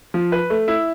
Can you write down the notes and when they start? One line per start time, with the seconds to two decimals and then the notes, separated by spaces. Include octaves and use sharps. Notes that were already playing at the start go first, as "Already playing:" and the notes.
0.14 F3
0.32 B4
0.50 A3
0.68 E4